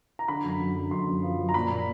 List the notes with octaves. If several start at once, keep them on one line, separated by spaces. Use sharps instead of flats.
A#5
D3 B5
F#2
F#2
D3
F#2 C6
F#2
F3
F#2
A#5
A#2 B5
A#2